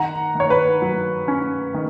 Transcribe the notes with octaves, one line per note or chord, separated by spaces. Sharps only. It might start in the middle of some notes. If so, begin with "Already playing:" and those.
Already playing: D#3 F#5 A#5
D#3 C#5
B4
F#3
C#4
D#3